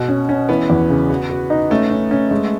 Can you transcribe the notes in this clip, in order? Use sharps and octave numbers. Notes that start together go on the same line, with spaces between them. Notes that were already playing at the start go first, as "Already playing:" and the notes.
Already playing: B2 F#4
C#4
C#4
E3 B3
E2
C#3
F#4
F#4
D#4
A3 C#4
C#4
C#4
G#3